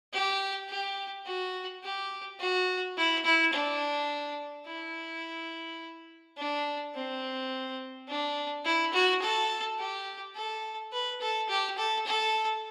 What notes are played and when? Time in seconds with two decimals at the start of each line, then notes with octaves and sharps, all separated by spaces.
0.13 G4
0.68 G4
1.25 F#4
1.83 G4
2.39 F#4
2.97 E4
3.24 E4
3.53 D4
4.66 E4
6.37 D4
6.95 C4
8.08 D4
8.65 E4
8.93 F#4
9.22 A4
9.79 G4
10.35 A4
10.92 B4
11.21 A4
11.49 G4
11.78 A4
12.06 A4